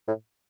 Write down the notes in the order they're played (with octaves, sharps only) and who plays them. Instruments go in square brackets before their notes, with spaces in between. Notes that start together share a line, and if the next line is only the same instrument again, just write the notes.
[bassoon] A2